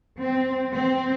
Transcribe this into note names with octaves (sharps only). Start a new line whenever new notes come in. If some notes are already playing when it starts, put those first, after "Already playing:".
C4
C4